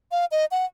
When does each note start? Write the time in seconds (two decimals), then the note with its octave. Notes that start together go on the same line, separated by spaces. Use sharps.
0.11 F5
0.31 D#5
0.51 F#5